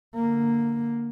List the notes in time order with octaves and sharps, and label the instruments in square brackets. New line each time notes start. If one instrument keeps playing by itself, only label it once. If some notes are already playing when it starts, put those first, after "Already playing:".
[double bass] D3 A#3